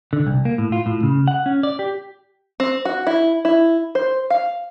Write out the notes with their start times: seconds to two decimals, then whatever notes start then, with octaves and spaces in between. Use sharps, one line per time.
0.13 D3
0.26 C2
0.45 A#3
0.58 A2
0.72 F4
0.86 A2
1.03 C#3
1.28 F#5
1.46 C#4
1.63 D5
1.79 G4
2.60 C4
2.85 F#4
3.07 E4
3.45 E4
3.95 C5
4.30 F5